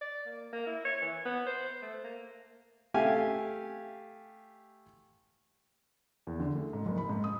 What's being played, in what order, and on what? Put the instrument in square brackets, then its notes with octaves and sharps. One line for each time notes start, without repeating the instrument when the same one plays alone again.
[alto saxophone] D5
A#3
A#3
E4
C#5
E3
B3
C5
A3
A#3
[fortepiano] A3 G4 F5 G#5
[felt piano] E2
D3
A3
G#2
F#1
B5
G#2
D#6